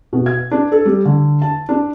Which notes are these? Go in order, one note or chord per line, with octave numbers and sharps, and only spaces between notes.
B2
G#6
D4
A4
G3
D3
A5
D4